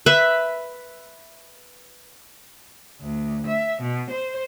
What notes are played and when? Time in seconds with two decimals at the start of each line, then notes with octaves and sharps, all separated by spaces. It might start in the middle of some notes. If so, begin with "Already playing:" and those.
0.06 B4 E5
3.01 D2
3.47 E5
3.82 B2
4.11 C5